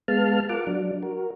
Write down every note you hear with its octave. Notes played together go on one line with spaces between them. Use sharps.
G#3 B3 F5 A5 F6
F4 A#4 F#5 D6
F#3 D4
F#4 A#4